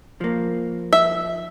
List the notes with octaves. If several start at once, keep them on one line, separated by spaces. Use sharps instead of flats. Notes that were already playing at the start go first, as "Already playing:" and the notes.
F3 A#3
E5